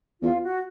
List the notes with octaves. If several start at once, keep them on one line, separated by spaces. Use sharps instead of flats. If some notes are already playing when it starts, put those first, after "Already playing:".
E2 F4
F#4